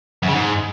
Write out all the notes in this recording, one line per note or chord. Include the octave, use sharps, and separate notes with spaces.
F#2
C#3
G#2